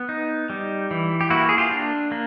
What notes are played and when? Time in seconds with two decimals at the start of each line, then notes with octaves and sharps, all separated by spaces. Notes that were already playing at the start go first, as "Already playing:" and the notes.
Already playing: B3
0.09 D#4
0.50 G3
0.91 E3
1.21 G4
1.30 A#3 E4 F#4
1.49 G#4
1.58 F4 G4
1.71 D4
2.12 A#3